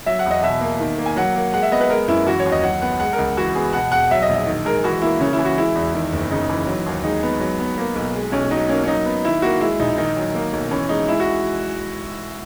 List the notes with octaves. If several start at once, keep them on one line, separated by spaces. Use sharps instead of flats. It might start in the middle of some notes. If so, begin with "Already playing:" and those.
F#3 E5
F#5
E2
D#5
B2 E5
A#3
D#3
A#3
G#5
F#3 F#5
A#3
G#3 F#5
E5
B3 D#5
B4
G#3 A#4
F#2 E4
E3 F#4
C#5
D#2
D#5
F#3 F#5
B3 F#5
G#3 F#5
A#4
C#2
E3 F#4
B3 G#4
B2 F#5
E1 F#5
F#3 E5
D#5
A#1
D#5
D#3
G#3 A#4
E3 F#4
A#3 E4
C#3 C#4
E4
E3
F#4
G#3 E4
E2
D#3
F#1
C#3 D#4
E3
F#3
D#2
G#3 D#4
B3
F#3
B3
A#3
B1
G#3
B1 C#4
F#3 D#4
A#3 C#4
C#4
F#3 D#4
B3
D#3 E4
A#3 F#4
G#3 E4
A#1 D#4
D#3 D#4
F#3
A#3
B1
E3 C#4
G#3 D#4
G#3 E4
F#4